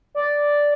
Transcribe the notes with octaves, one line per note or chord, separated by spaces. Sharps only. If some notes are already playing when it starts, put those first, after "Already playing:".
D5